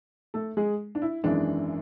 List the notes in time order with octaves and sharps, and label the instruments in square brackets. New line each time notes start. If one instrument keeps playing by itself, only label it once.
[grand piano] A3 A4
G#3 G#4
D4
E4
G#1 F#2 E3 G#3 D4